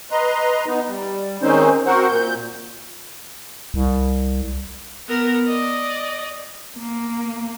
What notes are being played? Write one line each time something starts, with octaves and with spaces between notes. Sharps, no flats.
B4 D#5 A#5 C6
B3 D#4
G3
D#3 G#3 C4 C#4 D#4 C5
C4 F#4 A#4 C5 F#5
A#2 G6
C2
B3 A#4
D5 D#5
A#3